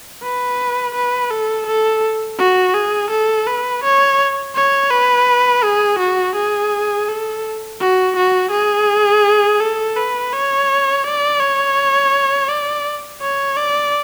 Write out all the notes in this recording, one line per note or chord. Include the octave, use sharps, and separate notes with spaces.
B4
B4
A4
A4
F#4
G#4
A4
B4
C#5
C#5
B4
G#4
F#4
G#4
A4
F#4
F#4
G#4
A4
B4
C#5
D5
C#5
D5
C#5
D5